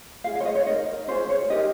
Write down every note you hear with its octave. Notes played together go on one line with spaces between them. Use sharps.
F4 G#4 F5
F5
C#5
D#5
C#5
D#4 A#4 D#5
C#4 F4 G#4 C5
C5
C#5
D#4 G4 A#4 D#5